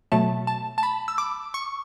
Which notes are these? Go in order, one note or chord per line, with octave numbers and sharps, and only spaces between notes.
B2 F#3 A3 A5
A5
A5
B5
E6
D6
C#6